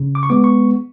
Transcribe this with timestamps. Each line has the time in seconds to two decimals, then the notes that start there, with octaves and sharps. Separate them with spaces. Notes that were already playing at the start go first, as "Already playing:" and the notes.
Already playing: C#3
0.15 D6
0.23 C#6
0.30 G#3 B3 D6
0.44 C#6